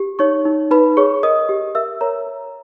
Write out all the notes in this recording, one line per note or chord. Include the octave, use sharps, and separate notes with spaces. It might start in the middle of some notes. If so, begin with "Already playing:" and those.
Already playing: G4
D#4 C#5 C#6
D#4
D#4 B4 B5
G#4 C#5 C#6
A#4 D#5 D#6
G4
A#4 E5 E6
A#4 C#5 A#5
A#4